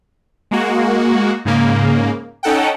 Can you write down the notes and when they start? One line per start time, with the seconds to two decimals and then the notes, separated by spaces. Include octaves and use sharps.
0.51 G#3 A#3 F#4
1.45 G#2 C#3 A#3
2.43 C#4 D#4 A4 F#5 G5